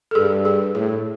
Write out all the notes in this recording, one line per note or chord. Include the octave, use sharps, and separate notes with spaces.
A4
G2 G#4
G#4
A2 G#4